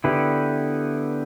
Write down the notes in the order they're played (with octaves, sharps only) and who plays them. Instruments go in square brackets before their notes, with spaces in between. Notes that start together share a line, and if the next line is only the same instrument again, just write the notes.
[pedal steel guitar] D3 B3 E4 G4 B4